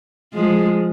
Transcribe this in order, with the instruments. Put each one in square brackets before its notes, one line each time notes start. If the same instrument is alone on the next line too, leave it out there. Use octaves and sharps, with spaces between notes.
[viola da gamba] F3 G#3